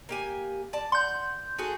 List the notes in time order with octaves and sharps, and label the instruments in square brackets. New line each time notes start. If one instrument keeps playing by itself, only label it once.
[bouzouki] A#3 G4 G#5
D5 A5
[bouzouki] F#5 [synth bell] C6 G6
[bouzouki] F#4 G#4 A4